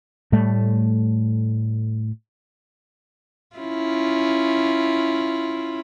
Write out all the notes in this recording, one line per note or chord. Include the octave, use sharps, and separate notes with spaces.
A2 G3 A3
C#4 E4 F4